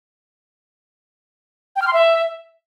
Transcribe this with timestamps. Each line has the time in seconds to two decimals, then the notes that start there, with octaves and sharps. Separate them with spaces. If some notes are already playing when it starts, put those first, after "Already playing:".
1.76 G5
1.82 F6
1.87 C6
1.93 E5